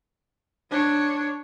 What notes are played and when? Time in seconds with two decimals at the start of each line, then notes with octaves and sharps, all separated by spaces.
0.70 D4 C#5